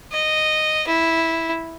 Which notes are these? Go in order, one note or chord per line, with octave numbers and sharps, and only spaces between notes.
D#5
E4